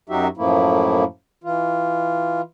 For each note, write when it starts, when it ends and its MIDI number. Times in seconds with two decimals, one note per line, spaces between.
0.09 0.28 42
0.09 0.28 54
0.09 0.28 63
0.09 0.28 66
0.09 0.28 67
0.09 0.28 76
0.37 1.04 42
0.37 1.04 45
0.37 1.04 53
0.37 1.04 57
0.37 1.04 58
0.37 1.04 64
1.44 2.41 52
1.44 2.41 65